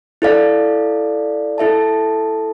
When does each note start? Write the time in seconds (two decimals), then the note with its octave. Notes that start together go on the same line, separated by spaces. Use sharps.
0.22 E4 A4 D5 F5
1.58 E4 A4 E5 A5